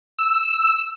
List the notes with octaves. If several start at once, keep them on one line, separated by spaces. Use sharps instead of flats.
E6